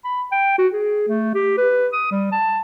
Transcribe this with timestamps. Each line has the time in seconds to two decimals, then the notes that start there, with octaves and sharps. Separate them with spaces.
0.05 B5
0.32 G5
0.59 F#4
0.73 G#4
1.08 A3
1.34 G4
1.58 B4
1.93 D#6
2.11 G3
2.32 A5